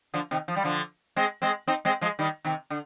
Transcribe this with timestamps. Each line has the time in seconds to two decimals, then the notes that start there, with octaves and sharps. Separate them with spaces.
0.14 D3 F3
0.31 C3 D#3
0.48 F3
0.56 G3
0.65 D3 F3
1.16 G#3 C4
1.42 G#3 C4
1.67 C4 D#4
1.85 G#3 C4
2.01 F3 G#3
2.19 D#3 G3
2.45 C3 D#3
2.70 D3